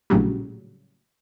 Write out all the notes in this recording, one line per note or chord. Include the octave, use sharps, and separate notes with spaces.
A#1 A2 C#3 F#3 G3